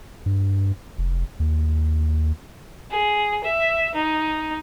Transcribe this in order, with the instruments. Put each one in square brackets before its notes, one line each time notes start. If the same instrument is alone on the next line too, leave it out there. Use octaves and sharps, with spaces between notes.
[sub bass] G2
F1
D#2
[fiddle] G#4
E5
D#4